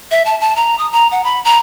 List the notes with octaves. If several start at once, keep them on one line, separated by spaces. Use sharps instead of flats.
E5
A5
A5
A#5
D#6
A#5
F#5
B5
A#5